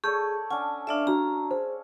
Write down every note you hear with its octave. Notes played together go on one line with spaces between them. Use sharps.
G#4 A4 C#5 D5 C#6 G6
C#4 D4 F#5 G#5
D4 A4 D5 E5 F5
D4 F#4 A#5
G#4 C5